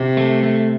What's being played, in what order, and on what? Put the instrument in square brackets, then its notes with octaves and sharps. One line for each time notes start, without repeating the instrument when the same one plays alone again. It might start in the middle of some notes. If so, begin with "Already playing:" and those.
Already playing: [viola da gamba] C3
[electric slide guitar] A3
A3